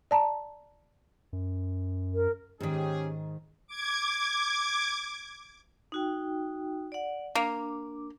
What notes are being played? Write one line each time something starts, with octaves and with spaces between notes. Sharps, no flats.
D5 A5 A#5
F#2
A#4
G#2 D#3 C#4 G4 G#4
D6 G#6
D#4 F#4 G5
D5 F#5
A#3 D4 D6